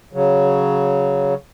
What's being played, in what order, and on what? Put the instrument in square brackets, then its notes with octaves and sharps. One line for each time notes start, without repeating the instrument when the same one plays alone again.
[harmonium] C#3 F#3